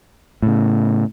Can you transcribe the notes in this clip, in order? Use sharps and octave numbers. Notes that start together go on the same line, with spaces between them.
A2 C#3